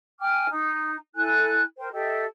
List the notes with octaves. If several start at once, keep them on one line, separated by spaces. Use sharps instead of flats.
G5 G#5 D6 F6
D#4
E4 A4 G#5 F#6
A#4 C5 G5
G4 A4 D#5 E5